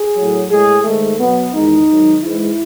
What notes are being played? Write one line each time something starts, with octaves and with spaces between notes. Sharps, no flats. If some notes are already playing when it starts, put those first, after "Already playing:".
Already playing: G#4
A2 F#3
A2 G#3 G#4
G#2 D#3 G#3 A3
B2 F#3 B3
E2 D#3 G#3 D#4
G#2 D#3 F#3
G#2 E3 G#3 E4